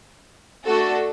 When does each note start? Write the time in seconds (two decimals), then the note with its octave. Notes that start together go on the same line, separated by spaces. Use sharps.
0.65 A3 D4 F#4 A4